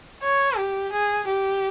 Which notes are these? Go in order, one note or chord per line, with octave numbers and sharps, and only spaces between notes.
C#5
G4
G#4
G4